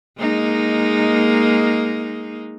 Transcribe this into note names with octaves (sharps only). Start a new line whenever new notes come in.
G#3 A#3 D#4